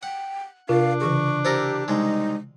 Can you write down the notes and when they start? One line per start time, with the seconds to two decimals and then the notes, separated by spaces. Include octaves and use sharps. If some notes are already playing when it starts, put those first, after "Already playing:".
0.03 F#5 G5
0.69 C3 D4 F4 A#4 F5
1.01 C#3 E3 G#4 C#6
1.45 E4 G4 A4 A#4 C5 A#6
1.88 C2 G#3 D#4